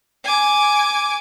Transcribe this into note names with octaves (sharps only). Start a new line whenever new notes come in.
G#5 D6